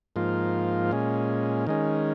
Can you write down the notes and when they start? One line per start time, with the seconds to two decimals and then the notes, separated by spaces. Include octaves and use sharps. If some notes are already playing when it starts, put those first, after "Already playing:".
0.16 G#2 F3 A#3 F4
0.91 A#2 G#3 C#4
1.67 D#3 G#3 C#4